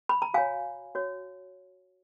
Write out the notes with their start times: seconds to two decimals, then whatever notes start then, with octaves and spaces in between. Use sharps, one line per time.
0.09 B5
0.22 A#5
0.34 F#4 C#5 F5 G#5
0.95 F#4 C#5